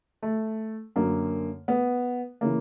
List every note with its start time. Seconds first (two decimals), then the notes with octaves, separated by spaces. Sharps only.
0.22 A3
0.96 F#2 D3 A#3
1.68 B3
2.41 C#3 E3 A#3